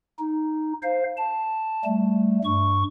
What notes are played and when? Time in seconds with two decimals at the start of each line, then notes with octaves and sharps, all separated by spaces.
0.19 D#4
0.83 C5 F5
1.17 A5
1.85 G3 A3
2.44 G2 C#6